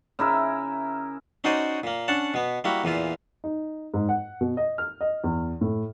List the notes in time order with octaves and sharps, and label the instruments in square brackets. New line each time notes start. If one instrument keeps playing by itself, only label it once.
[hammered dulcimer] C#3 E4 A#4 E5
[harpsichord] C#4 D#4 F#4 C5 D5 D#5
A#2 A#3
C#4 D4 F#5 A5
B2 B3
G3 A#3 E4 F#4
E2 A#2 E3 F4
[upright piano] D#4
G#2
F#5
B2
D#5
F6
D#5
E2
A2